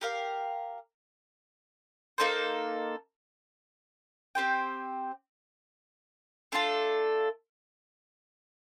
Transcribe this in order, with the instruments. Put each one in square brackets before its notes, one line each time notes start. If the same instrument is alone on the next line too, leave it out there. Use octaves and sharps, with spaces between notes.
[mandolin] G4 A#4 F5
A#3 D#4 A4 C5
C4 G4 C5 G5
A3 D4 F4 A4